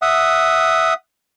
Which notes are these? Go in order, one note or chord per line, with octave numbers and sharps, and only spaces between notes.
E5 F#5 D#6